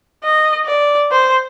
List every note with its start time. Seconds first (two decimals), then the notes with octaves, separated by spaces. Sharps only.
0.24 D#5
0.66 D5
1.11 C5